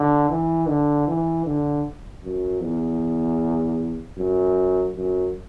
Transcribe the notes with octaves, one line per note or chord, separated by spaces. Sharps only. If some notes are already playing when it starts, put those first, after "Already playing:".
Already playing: D3
E3
D3
E3
D3
F#2
E2
F#2
F#2